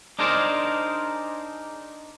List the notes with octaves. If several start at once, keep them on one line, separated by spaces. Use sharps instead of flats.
D4 D#4 G#4 A#4 C5 D5